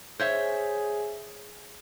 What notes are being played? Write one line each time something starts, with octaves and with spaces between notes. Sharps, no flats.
G#4 C5 C#5 E5